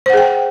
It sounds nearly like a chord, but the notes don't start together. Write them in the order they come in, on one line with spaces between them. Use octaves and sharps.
C5 F#5 G#4 G5